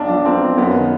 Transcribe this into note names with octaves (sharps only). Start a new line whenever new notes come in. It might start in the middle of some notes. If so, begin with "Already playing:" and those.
Already playing: B1 D4
F3
B1 C4
B1
F#2 B3
D#3